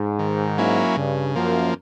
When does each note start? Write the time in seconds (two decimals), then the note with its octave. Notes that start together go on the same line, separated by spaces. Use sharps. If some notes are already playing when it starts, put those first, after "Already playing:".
Already playing: G#2
0.19 D#3
0.58 F#3 A#3 C#4 E4
0.97 G2 C#3
1.35 F#2 F3 A#3